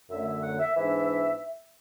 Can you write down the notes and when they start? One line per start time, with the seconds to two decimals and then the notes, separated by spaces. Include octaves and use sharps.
0.10 F#2 D3 A3 E5
0.27 E5
0.43 F#5
0.60 E5
0.76 G#2 E3 B3 D4 E5